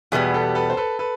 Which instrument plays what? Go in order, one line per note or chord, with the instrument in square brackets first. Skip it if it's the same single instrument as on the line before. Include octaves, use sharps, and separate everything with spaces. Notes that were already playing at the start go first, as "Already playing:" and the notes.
[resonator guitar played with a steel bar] E2 B2 G3 B3 [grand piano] F#4 G#4
[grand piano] G4 A4
A4 B4
C5
A4 B4
A4 B4